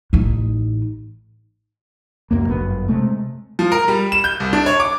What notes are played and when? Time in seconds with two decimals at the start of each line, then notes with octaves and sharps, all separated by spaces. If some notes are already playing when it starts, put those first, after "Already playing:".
0.13 A1 D#4
2.31 C#2 F#2 A2 A#3
2.48 G1 F#2 B3
2.88 C3 G#3 A3
3.59 F3
3.72 A#4
3.88 G3
4.12 E7
4.24 G6
4.40 C2
4.53 D4
4.66 C#5
4.80 D6